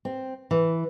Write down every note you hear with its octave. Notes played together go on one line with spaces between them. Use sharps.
C4
E3